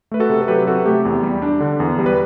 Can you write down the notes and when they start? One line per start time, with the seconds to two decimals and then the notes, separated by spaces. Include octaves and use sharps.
0.11 A3 B4
0.20 F#4 A4
0.29 C3
0.42 A4
0.48 F#3 G4 B4
0.67 C3 F#4 A4
0.85 A3 G4
1.05 E2
1.23 G3
1.42 D4
1.60 D3
1.80 E2
1.98 G3
2.06 B4